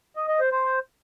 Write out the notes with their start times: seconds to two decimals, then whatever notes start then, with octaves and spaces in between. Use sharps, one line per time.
0.16 D#5
0.28 D#5
0.40 C5
0.52 C5